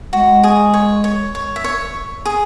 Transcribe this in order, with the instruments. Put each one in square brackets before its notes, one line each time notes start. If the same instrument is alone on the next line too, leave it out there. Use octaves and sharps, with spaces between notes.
[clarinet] G#3 [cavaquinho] F#4
[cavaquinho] G#4
C#5
C#5
C#5
E5
C#5
G#4